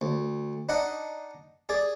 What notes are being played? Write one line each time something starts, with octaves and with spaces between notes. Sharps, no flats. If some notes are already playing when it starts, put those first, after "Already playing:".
D2
D4 D#4 D#5 F#5
G#4 D5